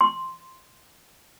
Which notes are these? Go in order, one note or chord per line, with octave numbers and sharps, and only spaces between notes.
C6